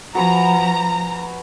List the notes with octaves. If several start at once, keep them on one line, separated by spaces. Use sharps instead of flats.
F3 F#4 B4 G#5 A#5